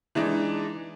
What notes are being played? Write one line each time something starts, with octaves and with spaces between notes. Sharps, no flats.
E3 G#3 D4 D#4